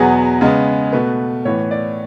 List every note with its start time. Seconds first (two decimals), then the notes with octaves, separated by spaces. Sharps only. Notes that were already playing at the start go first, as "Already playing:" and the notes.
Already playing: E2 B2 F#3 B3 G#4
0.41 C#3 G#3 B3
0.93 B2 A3 B4
1.45 A2 E3 B3 C#5
1.71 D5